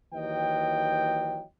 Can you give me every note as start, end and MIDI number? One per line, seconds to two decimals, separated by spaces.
0.13 1.42 39
0.13 1.42 52
0.13 1.42 54
0.13 1.42 75
0.13 1.42 79